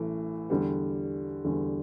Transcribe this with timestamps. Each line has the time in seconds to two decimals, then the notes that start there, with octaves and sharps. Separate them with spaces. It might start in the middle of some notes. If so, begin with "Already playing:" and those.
Already playing: A1 E3 A3
0.50 E2 D3 G3
1.45 E2 D3 G3